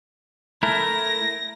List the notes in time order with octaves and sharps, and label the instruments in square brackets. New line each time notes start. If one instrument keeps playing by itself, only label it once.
[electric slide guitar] A3 E4 A#4 [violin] A#6